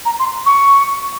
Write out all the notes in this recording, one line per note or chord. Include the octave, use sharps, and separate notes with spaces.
A#5
C6
C#6